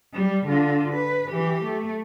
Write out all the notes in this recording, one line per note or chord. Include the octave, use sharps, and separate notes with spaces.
G3
D3 F4
B4
E3 G4
A3